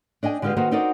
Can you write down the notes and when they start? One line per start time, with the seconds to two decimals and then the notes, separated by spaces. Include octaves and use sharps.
0.23 D4 D#5 G5 G#5
0.42 D3 G#3 F4 G4 B4
0.56 D#3 A#3 D#4 F#4 B4 C5
0.71 C4 D4 D#4 F#4 A#4 D5